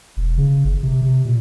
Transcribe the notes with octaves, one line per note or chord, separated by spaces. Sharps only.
E1
C#3
G1
C3
C3
A#2